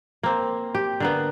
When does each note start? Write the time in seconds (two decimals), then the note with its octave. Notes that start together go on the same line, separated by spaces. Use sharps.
0.23 A#3 C4
0.75 G4
1.00 D3 A#3 B3